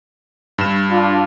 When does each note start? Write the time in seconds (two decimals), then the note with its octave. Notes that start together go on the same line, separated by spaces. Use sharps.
0.58 G2 E7
0.90 D4 F4